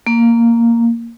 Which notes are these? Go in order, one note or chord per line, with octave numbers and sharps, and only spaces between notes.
A#3